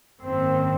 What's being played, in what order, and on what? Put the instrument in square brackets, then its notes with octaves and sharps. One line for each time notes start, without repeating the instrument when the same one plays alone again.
[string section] G#1 F#2 D#3 A#3 [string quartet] C4